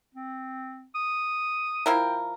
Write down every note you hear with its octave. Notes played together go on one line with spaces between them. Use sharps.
C4
D#6
F3 E4 A#4 G5